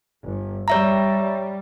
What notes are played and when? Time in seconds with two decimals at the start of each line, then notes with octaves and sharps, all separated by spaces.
0.25 G1
0.68 G3 C#5 E5 A#5